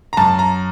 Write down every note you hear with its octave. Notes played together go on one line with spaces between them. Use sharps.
A#5
F#2 A5
A#5